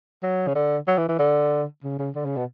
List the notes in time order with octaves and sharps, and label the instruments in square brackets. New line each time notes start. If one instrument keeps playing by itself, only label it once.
[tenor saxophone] F#3
C#3
D3
F#3
E3
E3
D3
C#3
C#3
D3
C#3
B2